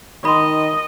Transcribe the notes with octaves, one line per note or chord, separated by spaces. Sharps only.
D#3 D#5 B5 C6